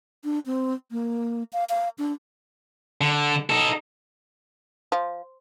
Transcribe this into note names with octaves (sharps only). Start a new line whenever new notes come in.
D4
C4
A#3
F5
F5
D4
D3
D#4 A4
F3